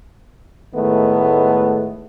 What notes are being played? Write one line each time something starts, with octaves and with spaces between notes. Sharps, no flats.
A2 D#3 G#3 A3 B3